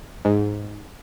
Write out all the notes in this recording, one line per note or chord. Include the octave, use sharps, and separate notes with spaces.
G#2